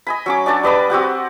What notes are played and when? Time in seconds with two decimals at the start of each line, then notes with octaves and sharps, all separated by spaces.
0.07 D#5 G#5 B5
0.26 F#3 C#4 D6
0.46 D4 F#4 D5 A5
0.63 G3 B4 D#5 D6
0.90 C4 F#4 G4 F#5